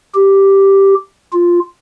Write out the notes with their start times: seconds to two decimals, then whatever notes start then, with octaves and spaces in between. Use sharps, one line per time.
0.14 G4
1.33 F4